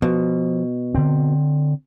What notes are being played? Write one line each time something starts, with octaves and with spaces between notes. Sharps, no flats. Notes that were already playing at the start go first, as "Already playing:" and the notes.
B2 F3
D3 C4